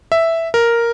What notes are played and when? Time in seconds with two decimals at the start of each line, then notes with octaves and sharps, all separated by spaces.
0.12 E5
0.54 A#4